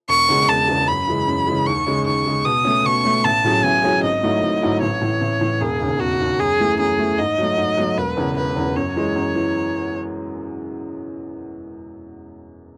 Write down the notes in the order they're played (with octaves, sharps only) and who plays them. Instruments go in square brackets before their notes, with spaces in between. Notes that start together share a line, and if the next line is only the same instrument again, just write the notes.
[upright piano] E1 [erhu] C#6
[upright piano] E2 C#3 G#3
[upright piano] E1 [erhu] A5
[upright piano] E2 C#3 G#3
[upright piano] F#2 [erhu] B5
[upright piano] C#3 E3 G#3
F#2
C#3 E3 G#3
[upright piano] D#2 [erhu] C#6
[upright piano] C#3 G#3
[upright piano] D#2 [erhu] C#6
[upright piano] C#3 G#3
[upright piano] B2 [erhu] D#6
[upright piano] A3 C#4
[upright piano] B2 [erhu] C#6
[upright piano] A3 C#4
[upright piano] A1 [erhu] A5
[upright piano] A2 F#3 C#4 G#4
[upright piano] A1 [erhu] G#5
[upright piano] A2 F#3 C#4 G#4
[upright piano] G#1 [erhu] D#5
[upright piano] G#2 F#3 A3 E4
G#1
G#2 F#3 A3 E4
[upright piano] A1 [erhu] C#5
[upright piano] A2 E3
A1
A2 E3
[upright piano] E1 [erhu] G#4
[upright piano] D#2 C#3
[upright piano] E1 [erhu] F#4
[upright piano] D#2 C#3
[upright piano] F#2 [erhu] G#4
[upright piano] E3 A3
[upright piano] F#2 [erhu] G#4
[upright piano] E3 A3
[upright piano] G#2 [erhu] D#5
[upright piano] F#3 A3
G#2
F#3 A3
[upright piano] E1 [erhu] B4
[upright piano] E2 C#3
[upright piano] E1 [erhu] B4
[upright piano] E2 C#3
[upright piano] F#2 [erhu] C#5
[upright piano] E3 G#3
F#2
E3